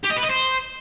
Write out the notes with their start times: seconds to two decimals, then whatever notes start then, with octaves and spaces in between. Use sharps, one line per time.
0.03 G4
0.10 D#5
0.16 B4
0.23 D#5
0.29 C5